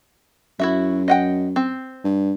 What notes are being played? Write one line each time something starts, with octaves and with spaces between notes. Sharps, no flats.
F#2 E4 F#4 E5
D#5 F#5 G5
C4
G2